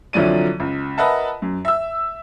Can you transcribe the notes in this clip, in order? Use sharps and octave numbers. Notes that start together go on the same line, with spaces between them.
C2 D3 F3 F#3 D5 D#7
C#2
A#4 B4 D#5 E5 F#5 A5
F#2
E5 E6